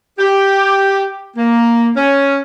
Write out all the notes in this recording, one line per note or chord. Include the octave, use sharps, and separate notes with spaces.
G4
A#3
C#4